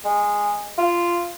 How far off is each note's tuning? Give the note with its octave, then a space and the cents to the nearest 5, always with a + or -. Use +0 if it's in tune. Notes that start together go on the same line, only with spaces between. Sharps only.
G#3 -15
F4 -10